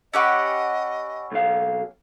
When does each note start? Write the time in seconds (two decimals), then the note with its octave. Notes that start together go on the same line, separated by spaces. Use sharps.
0.14 C#4 G4 D#5 F#5 B5 C#6 E6
1.31 B1 F5